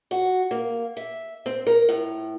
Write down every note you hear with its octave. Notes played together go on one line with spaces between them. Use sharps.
F#4
A#3
E5
C4
A#4
A2